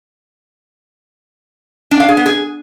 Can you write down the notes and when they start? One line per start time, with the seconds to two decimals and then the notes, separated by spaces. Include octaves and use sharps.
1.91 D4
2.00 F5
2.09 G#4
2.17 B3
2.26 G#4